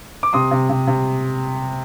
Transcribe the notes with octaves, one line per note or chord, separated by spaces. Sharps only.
D6
C3 C6 D#6
C3
C3
C3